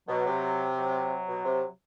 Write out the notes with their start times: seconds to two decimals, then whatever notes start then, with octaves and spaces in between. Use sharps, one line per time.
0.08 B2 F#3
0.26 C3
0.77 F#3
1.28 B2
1.45 C3